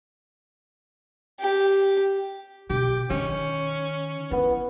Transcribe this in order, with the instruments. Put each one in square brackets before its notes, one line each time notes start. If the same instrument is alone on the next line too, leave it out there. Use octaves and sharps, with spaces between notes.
[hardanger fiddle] G4
[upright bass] B2 [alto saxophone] G4
[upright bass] D#3 [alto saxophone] C#4
[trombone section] B3 [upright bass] E4